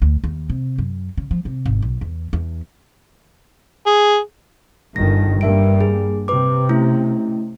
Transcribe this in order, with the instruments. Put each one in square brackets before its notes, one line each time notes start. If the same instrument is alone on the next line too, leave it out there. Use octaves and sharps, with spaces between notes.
[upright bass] D2
D#2
C3
F#2
C#3
F3
C3
G#1
B1
E2
E2
[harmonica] G#4
[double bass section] G1 D#3 [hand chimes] A#6
[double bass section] G2 G3 A#3 [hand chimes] A#4 E5 D7
[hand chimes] G#4
[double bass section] C3 [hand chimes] B4 D6
[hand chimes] A3 C#4 E4